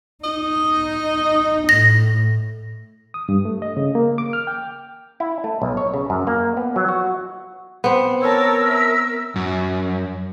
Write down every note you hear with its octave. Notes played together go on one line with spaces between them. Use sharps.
D#4 D#5
A2 A#6
D#6
G2
A3
D#5
C#3
A#3
D6
F6
G5
E4
A3
B1
C#5
C#3
F#2
A#3
B3
F#3
F#4
B3 C4
A#4 C#5 A5 E6
E5
F#2